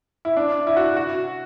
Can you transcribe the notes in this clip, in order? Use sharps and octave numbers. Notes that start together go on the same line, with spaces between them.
E4
D4
E4
F#4
F#4